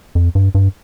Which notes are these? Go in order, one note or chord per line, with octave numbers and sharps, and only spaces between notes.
F2
G2
G2